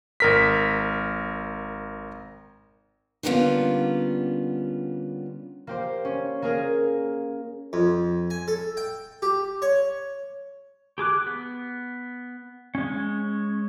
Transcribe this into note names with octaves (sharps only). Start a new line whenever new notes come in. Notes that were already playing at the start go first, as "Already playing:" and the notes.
G#1 A#4 B6
D3 G3 A#3 B3 C#4 F4
A#3 G4 C5
C#4
A#3 G#4 A#4
F2
G#5
A4
G5
G4
C#5
G4 G#4 D6 F#6
B3
G#3 C#4